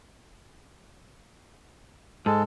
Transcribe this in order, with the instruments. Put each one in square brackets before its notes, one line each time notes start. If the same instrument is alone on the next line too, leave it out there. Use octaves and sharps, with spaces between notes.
[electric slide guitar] G#2 [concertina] G#3 A4